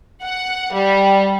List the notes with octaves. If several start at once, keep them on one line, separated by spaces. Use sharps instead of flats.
F#5
G3